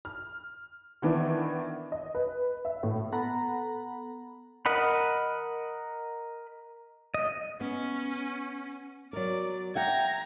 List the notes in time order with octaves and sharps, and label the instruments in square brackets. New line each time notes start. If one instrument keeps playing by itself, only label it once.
[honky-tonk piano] F6
D#3 E3 B3 D4
D#5
B4
E5
A2
[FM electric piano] B3 A4 F#5 A#5 B5
[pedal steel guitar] A#4 D#5 F#5 B5
D#5
[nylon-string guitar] B3 [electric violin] C#4
[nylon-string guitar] F#3 A#4 [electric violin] D5
[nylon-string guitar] E5 F#5 G5 [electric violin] A#5 G#6